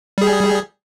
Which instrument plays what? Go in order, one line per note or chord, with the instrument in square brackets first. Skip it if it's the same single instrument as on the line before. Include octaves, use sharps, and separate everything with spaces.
[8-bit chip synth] G3 G#4